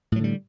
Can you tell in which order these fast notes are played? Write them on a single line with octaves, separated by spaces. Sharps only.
A2 F#3 D3 G3